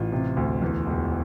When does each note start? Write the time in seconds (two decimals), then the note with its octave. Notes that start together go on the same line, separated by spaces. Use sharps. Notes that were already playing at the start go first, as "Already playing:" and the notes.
Already playing: A1 F4
0.12 C3
0.37 D2
0.62 E2
0.86 E1